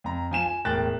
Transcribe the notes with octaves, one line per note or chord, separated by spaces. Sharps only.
F2 A#5
F3 G#5 E7
G#5
E1 A2 A#4 G5 F#6 A6